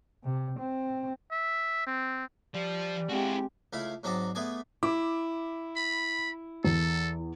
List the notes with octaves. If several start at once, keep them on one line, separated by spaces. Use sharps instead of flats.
C3
C4
E5
C4
F3 G3
G#3 C4 E4 F#4 G4
C#2 A3 E4 F5 B5
G#2 F#3 C4 A4 D5 D#5
A3 B3 G#4 D5 G#5
E4 D6
B5
E2 A4